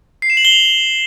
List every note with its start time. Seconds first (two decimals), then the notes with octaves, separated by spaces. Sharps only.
0.22 C7
0.30 E7
0.37 F#7
0.45 G7
0.52 F7